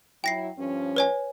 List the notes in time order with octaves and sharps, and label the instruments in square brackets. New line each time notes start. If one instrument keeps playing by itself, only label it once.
[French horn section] F#3 E4 [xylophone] G5 A#6 C7
[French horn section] G2 F3 C#4
[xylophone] B4 C#5 G#5